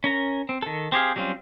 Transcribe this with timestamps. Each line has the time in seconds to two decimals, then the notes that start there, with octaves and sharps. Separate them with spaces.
0.04 C#4 A#4 A#5
0.49 C4
0.62 D#3 A4
0.92 C4 G4 G#4 F5
1.16 F#3 G3 C4 C#4 F4